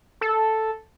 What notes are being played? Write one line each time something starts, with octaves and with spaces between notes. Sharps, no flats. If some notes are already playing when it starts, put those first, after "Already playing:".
A4